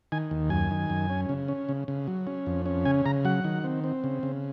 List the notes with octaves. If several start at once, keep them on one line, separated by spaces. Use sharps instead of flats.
D#3 G#5
D#2
F#2 G#5
D#3
F#2
C#4
C#3
C#4
C#3
C#3
F#3
C#4
F2
C#4
C#3 G#5
C#3 A#5
F#3 F#5
D#3
C4
C4
C#3
C#3